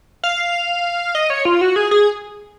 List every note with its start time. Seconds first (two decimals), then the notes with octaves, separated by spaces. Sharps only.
0.24 F5
1.15 D#5
1.30 C#5
1.45 F4
1.61 F#4
1.76 G#4
1.91 G#4